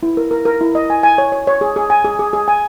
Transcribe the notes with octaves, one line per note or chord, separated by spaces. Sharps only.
E4
A#4
A#4
A#4
E4
D#5
G#5
G#5
C#5
C#5
C#5
G#4
G#4
G#5
G#4
G#4
G#4
G#5